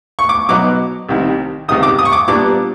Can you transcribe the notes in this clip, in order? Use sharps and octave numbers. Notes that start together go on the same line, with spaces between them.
C#6
D6
B2 F#3 B3 D#4 D6
C2 C3 D#3
C#2 C3 D#3 D#6
D6
D#6
C#6
D6
A#2 G3 B3 D4 D6